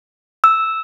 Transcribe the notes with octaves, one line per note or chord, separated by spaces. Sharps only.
E6